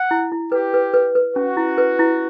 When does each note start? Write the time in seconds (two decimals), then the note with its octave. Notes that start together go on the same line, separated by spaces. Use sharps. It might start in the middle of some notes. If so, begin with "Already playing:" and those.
Already playing: F#5
0.11 E4
0.32 E4
0.52 G4 B4
0.74 B4
0.94 B4
1.15 B4
1.36 C#4 F#4
1.57 E4
1.78 B4
1.99 E4